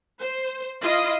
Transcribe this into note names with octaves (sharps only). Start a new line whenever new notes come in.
C5
E4 F4 D#5